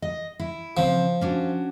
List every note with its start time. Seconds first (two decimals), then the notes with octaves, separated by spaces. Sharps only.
0.02 D#5
0.40 E4
0.77 C#3 F3 C4
1.21 C#4 D4 F#4